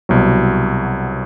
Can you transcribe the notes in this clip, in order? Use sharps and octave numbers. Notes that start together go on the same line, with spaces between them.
C2 B2 F#3